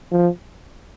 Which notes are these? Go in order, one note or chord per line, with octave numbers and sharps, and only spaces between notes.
F3